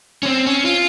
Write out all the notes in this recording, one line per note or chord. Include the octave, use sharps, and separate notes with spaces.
C#4
C4
C#4
F4